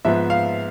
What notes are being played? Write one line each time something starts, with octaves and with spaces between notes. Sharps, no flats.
G#2 F3 B3 E5
F5